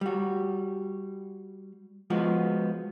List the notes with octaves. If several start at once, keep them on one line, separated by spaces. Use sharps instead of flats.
G3 F#4
F3 G#3 B3 F#4